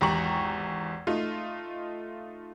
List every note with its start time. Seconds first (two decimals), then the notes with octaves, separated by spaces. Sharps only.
0.01 G#1 E2 G4 A#5 C#6 F#7
1.07 A3 D#4 F4